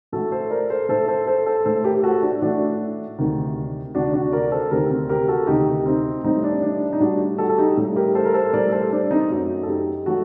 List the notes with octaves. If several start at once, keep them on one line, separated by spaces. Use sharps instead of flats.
A2 A3 F#4 A4
A4 C5
A#4 D5
A4 C5
A2 A3 A4 C5
A4 C5
A4 C5
A4 C5
A2 A3 A4 C5
G4 A#4
G4
F#4 A4
D4 F#4
A2 A3 D4 F#4
D2 C3 D#3
D2 C3 D#3 D4 F#4
D4 F#4
A#4 D5
A4 C5
D2 C3 D#3 G4 A#4
C4
G4 A#4
F#4 A4
D2 C3 D#3 D#4 G4
C4 D#4
A2 G3 C4 D#4
D4
D4
D4
D#4
A2 G3 D4 F#4
F#4 A4
A4
D#4 G4
A2 G3
G4 A#4
A4 C5
A#4
A4 C5
A2 G3 A#4 D5
A4 C5
D4
C4 D#4
F#2 F#3 A3
A4
D#4 G4
F#3 A3 F#4 A4